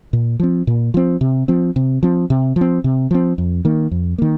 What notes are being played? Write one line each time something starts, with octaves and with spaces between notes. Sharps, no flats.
A#2
F3 C4
A#2
F3 C4
C3
F3 C4
C3
F3 C4
C3
F3
C4
C3
F3 C4
F2
D#3 A#3
F2
D#3 A#3